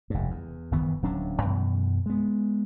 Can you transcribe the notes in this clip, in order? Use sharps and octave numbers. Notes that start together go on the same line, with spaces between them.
F1 G2
E2
F#1 D#3 E3 B3
D1 F#3 C#4 D4
F#2 B2 E3
G#3 B3